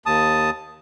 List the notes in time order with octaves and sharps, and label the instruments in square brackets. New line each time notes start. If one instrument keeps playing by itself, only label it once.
[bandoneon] D#2 A5 D#6